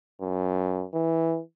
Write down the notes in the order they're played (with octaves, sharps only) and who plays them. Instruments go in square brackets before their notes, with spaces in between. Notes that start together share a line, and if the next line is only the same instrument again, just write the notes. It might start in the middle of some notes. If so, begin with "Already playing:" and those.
[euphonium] F#2
E3